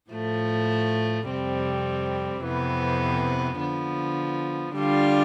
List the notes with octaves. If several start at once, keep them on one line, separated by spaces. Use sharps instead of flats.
A2 F3 A3
F2 C3 G3 C4
F2 C3 E3 B3
D3 F3 B3
D3 G3 D4 F4